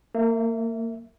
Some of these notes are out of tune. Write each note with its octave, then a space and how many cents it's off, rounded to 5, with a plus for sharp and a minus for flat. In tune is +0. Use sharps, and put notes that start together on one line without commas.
A#3 -30 E5 +0